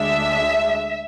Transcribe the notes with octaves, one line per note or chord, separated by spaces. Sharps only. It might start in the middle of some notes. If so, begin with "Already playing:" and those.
Already playing: D2 D3 G#3 D4 E5